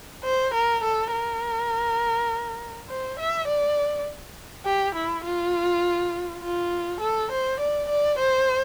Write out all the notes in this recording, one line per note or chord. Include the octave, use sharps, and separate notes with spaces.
C5
A#4
A4
A#4
C5
E5
D5
G4
E4
F4
F4
A4
C5
D5
D5
C5